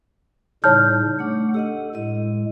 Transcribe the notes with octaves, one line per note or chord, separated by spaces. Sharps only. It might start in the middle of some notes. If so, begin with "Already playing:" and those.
A2 C#3 G3 D#4 C#5 A5 F6 G6
A3 D4 F#5 C#6
G4 A4 D#5 F#5
A2 G#3 D#5